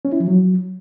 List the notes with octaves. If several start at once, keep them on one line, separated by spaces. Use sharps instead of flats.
C#4
E4
F3
F#3